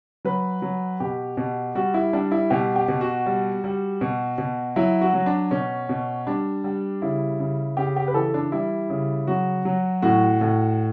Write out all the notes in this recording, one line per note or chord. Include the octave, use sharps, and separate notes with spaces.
F#3 B4
F#3
B2 G4
B2
G3 F#4
E4
G3 D4
E4
B2 G4
G4
B2
F#4
G3
G3
B2
B2
F#3 E4
F#4
F#3
D4
B2 C#4
B2
G3 D4
G3
C#3 E4
C#3
C#3 G4
G4
B4
E3 A4
D4
G3 E4
C#3
F#3 F#4
F#3
A2 F#4
A2